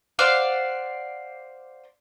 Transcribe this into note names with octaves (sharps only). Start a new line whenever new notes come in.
C5 D5 F5 F#5